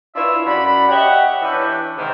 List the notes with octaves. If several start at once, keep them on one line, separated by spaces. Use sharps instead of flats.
D4 E4 F4 C#5 E5 E6
F#2 D5 F#5 B5
G4 C#5 D#5 E5 F#5
E3 C#4 D4 G4 B4
G#2 C3 D#3